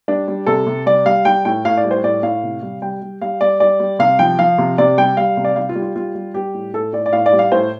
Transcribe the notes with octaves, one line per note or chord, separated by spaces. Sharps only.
G3 D4
G3
C3 A4
C3
G3 D5
G3 F5
G3 G5
A2 G5
A2 F5
D5
G3
C5
A2 D5
A2 F5
C3
G3
G3 G5
G3
G3 F5
G3 D5
G3 D5
G3
C3 F5
F3 G5
F3 F5
C3
C3 D5
G3 G5
G3 F5
C3
D5
G3 F5
F4
G3
F4
G3 F4
G3
G3 G4
A2
A2 A4
A2 D5
D5
A2 F5
D5
G3
F5
A2 C5